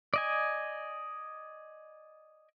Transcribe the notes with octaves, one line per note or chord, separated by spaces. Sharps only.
D5 D#5 G#5